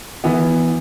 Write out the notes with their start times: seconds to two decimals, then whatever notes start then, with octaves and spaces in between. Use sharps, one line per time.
0.24 E3 B3